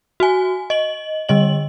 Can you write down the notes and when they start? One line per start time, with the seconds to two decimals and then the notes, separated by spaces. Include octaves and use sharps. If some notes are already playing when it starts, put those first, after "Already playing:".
0.20 F#4 G#5
0.70 D#5 F#7
1.29 D3 G3 D#5 F#7